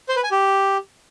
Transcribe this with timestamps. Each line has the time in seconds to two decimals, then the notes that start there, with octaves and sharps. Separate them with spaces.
0.09 C5
0.16 B4
0.24 G#5
0.31 G4